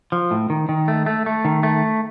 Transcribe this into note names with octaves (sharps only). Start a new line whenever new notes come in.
F3
A2
D#3
D#3
A3
A3
A3
D#3
A3